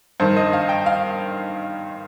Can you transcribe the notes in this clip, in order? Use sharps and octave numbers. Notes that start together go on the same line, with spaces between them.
G2 D#3 C5
D#5
F5
G5
F5